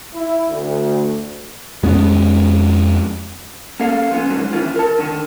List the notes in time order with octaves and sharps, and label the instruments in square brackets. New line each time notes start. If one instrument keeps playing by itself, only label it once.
[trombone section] E4
D2
[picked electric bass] F2 G#3 B3 C#4
[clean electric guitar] A#3 C#4 A4 F5
F3 B3 C#4
G#2 D3 D#3 F3 F#3
D#3 E3 C#4 F4
A#4 A5
D3 D#3